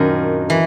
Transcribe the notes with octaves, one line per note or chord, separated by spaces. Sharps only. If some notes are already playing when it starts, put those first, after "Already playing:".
Already playing: F#2 A#2 D#3 C4 D4
E3